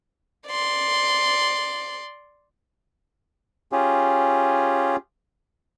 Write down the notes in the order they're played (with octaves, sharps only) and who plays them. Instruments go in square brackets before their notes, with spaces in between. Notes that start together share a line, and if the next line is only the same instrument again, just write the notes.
[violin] D5 C6
[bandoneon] C#4 F4 G4 G#4